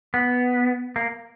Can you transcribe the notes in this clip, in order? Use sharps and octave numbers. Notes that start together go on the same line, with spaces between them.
B3
A#3